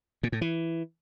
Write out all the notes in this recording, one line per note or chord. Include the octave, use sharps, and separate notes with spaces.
A#2
A2
E3